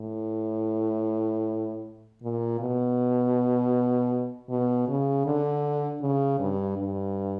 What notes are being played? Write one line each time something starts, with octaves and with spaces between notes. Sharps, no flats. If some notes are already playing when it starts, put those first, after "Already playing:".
Already playing: A2
A#2
B2
B2
C#3
D3
C#3
G2
G2